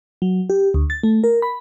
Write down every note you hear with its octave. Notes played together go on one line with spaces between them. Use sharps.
F#3
G4
D2
A6
A3
A#4
B5